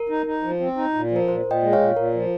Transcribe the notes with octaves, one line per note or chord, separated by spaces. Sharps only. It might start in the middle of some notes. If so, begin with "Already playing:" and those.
Already playing: A#4
D#4
D#4
F3
C4
D#4
A#2
F3
A#4
A#2 C5
A#2
D#5 G5
G#3
C#5 F5
A#2
A#2 A#4
F3